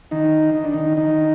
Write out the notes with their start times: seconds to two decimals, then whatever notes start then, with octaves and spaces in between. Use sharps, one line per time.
0.11 D#3 D#4
0.55 D#4
0.65 D4
0.73 D#3 D#4
0.97 D#3 D#4